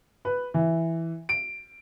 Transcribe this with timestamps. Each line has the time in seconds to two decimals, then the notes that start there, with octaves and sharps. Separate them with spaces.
0.25 B4
0.54 E3
1.29 D7